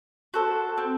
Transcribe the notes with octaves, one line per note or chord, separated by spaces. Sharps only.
F#4 A4 C5
C4